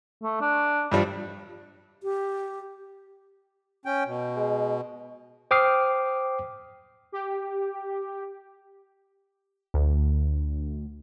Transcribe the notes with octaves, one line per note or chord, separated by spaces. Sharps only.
A3
D4
G2 F3 G3
G4
C#4 G5
B2
G#3
C5 G5 D6 D#6 F6 C7
G4
D2